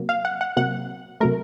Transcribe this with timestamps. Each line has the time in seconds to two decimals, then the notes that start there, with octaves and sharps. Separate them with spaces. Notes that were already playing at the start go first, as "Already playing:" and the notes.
Already playing: C3 F#3 A#3
0.09 F5
0.25 F#5
0.41 F#5
0.56 C3 F#3 A#3 F#5
1.20 C3 F#3 A3 A#4